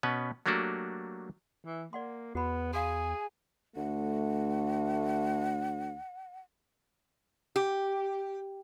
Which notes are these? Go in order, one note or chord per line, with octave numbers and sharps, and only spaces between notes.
B2 B3 C#4 B4
F#3 A3 A#3 D4 F#4 G4
E3
A#3 D5 F#5 C6
E2 B3 F#4 B5
G#4 F5 G#5 C6
D2 A3 F#5
G4